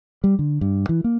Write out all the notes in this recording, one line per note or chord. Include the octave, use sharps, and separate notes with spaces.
G3
D3
G2
E3
A#3